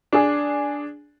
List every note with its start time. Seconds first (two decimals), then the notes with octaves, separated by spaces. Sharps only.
0.12 D4 G#4